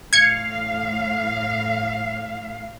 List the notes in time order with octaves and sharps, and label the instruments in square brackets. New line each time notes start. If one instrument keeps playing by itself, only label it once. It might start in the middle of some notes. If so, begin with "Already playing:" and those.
[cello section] A2 F5 [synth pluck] G#6 C#7